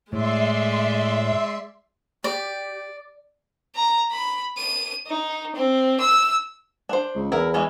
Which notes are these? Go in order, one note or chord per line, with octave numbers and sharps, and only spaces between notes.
A2 G#3 D5 E5 C6
G4 D5
A#5
B5
D#7
D#4
C4
E6
D4 C5
C#2
E2 E4 A#4
E3 G#3 C#4